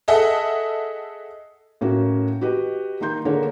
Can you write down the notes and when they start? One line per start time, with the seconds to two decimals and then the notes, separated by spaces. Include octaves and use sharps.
0.08 G#4 A4 D#5 E5 F#5
1.81 A2 A#3 C#4 F#4
2.41 F#4 G4 B4 D#5
3.01 D#3 A#3 A#5 C6 G6
3.25 D3 A#3 G#4 C#5